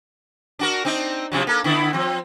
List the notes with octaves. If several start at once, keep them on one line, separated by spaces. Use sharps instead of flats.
D4 F#4 A#4
C4 D4 D#4
C3 F3 F#3
A#3 A4
D3 B3 E4
F3 C4